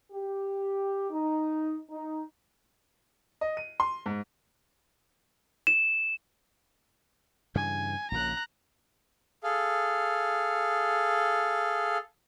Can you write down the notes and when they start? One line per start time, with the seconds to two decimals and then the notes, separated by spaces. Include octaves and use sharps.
0.12 G4
1.11 D#4
1.91 D#4
3.41 D#5
3.57 D#7
3.80 C6
4.06 G#2
5.67 E7
7.55 G2 C#3 E3 G#5
8.12 A#1 A#2 C#3 A#5 F#6
9.44 G#4 A4 F5